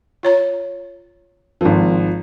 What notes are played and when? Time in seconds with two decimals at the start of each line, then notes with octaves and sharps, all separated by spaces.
0.23 F4 C#5 A#5
1.61 G#1 F3